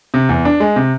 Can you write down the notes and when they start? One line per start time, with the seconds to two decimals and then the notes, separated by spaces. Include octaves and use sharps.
0.14 C3
0.29 E2
0.45 D4
0.60 G#3
0.76 C3